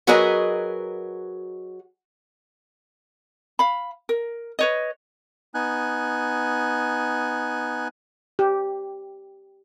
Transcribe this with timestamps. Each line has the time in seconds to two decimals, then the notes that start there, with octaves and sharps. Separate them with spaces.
0.07 F#3 F#4 G#4 A#4 B4 D#5
3.59 F5 B5
4.09 A#4
4.59 B4 C#5 D#5
5.54 B3 D#4 G#5 F#6
8.39 G4